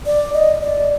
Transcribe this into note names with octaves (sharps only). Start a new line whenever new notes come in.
D5
D#5
D5